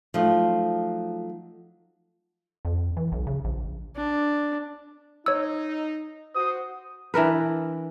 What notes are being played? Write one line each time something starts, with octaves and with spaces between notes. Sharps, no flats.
F3 F#3 A3 D#4
F2
E3
B1
C#3
A#1
D4
D#4 C#5 E6
F#4 C5 D#6
E3 D4 A#4 B4